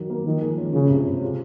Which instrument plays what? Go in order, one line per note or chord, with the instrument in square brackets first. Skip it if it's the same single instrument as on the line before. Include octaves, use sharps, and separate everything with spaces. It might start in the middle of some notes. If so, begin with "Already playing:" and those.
Already playing: [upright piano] D#3 F#3
A#3
[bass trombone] D#3 [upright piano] F3
[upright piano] G#3
C#4
[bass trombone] C#3 [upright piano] F4
[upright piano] C3
C4
F4